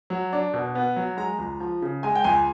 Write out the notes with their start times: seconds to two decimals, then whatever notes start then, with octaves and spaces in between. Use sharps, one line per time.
0.10 F#3
0.33 D4
0.54 B2
0.75 B3
0.96 F#3
1.17 G#3 A#5
1.39 C#2
1.60 F3
1.82 C#3
2.03 G#3 G#5
2.15 G5
2.24 C#2 G#5